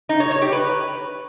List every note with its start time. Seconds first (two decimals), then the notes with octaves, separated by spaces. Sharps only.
0.09 D#4
0.20 C#5
0.31 C#5
0.42 G4
0.52 B4